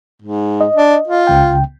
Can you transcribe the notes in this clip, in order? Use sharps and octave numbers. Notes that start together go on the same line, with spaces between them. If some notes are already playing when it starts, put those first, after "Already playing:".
G#2
D#5
D4
F4
C#2 C#3 G5